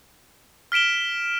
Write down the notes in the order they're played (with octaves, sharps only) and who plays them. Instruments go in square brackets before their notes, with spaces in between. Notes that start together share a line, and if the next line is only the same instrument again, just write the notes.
[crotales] F6 B6 D7 E7 G7